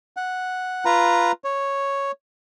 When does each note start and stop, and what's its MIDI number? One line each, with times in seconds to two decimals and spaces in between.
0.17 0.85 78
0.85 1.32 65
0.85 1.32 71
0.85 1.32 82
1.44 2.11 73